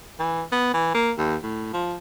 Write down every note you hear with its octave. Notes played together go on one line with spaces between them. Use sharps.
E3
B3
E3
A#3
D#2
A2
F3